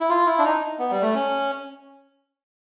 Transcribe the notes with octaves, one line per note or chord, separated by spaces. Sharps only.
E4
F4
E4
D4
D#4
B3
G3
A3
C#4